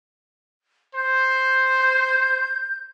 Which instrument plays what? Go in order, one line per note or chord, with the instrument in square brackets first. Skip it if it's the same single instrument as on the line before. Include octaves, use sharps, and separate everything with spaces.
[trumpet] C5 [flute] G6